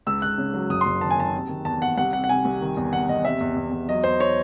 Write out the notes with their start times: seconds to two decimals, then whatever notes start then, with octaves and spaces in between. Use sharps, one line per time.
0.07 C#2 E6
0.22 C#2 F#6
0.38 C#3
0.54 F#3
0.70 F#1 D#6
0.81 C6
0.86 F#1
1.01 D#3 A5
1.11 G#5
1.18 D#3 A5
1.34 C3
1.49 D#3
1.65 E2 A5
1.82 E2 F#5
1.97 C2 F#5
2.13 C3 F#5
2.24 F#5
2.29 C3 G#5
2.45 C2
2.61 D#3
2.77 E2
2.93 E2 F#5
3.09 E2 D#5
3.24 C3 E5
3.41 E2
3.56 E2
3.72 E2
3.88 F#3 D#5
4.04 E2 C5
4.20 C#5